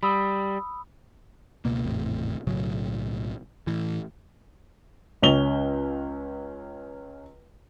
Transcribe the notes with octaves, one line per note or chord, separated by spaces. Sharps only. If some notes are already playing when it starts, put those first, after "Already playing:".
G3 B5 D#6 E6
C#2 B2 A#3
G#1 E2 A2 C3
B1 A2 C#3 F#3
A2 E3
C#2 C#4 F7 G7